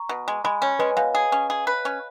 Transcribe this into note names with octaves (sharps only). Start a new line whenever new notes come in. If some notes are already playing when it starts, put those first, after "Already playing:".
Already playing: A#5 C#6
B2
G#3
G#3 G#5 B5
C#4 C#5
G#3 B4 D#5
B2 F5 G#5
G#4
C#4
G#4
B4
C#4